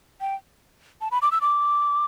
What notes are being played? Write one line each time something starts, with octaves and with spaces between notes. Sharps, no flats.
G5
A5
B5
D6
E6
D6